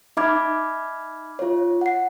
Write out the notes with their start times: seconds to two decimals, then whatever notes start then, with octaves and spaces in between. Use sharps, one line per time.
0.17 D#4 E5 B5 D6 F6 G#6
1.39 F4 C#5
1.81 F#5 C7